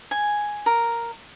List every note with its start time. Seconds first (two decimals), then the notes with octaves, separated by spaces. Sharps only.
0.11 G#5
0.66 A#4